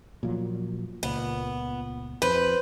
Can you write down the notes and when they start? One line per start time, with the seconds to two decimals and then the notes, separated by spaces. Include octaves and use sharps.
0.23 A#2 F3 F#3
1.03 C#2 A#2 B3
2.22 F2 B4 C5